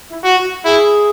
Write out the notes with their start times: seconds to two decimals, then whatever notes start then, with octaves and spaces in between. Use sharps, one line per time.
0.10 E4
0.24 F#4
0.38 F#4
0.65 E4 G#4